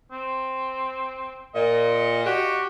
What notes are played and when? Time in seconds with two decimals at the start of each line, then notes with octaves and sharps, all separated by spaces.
0.12 C4
1.55 A#2 D#5
2.26 F#4 G4